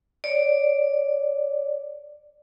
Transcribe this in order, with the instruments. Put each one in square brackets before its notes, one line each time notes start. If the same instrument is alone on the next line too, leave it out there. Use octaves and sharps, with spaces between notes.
[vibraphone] C#5 D5